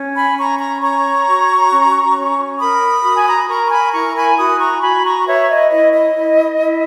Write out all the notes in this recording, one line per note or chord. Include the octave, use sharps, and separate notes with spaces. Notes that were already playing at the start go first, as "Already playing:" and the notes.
Already playing: C#4
G#5 B5
C#4 A#5 C#6
A#5 C#6
C#5 A#5 C#6
F#4
C#4
C#4
A#4 B5 D#6
F#4
G#5
A#5
B5
A#4 A#5 C#6
C#6
G#5 B5
E4 A#5 C#6
G#5 B5
F#4 B5 D#6
A#5 C#6
F#4 G#5 B5
A#5 C#6
B4 C#5 E5
D#5
E4 D#5
D#5
E4
E4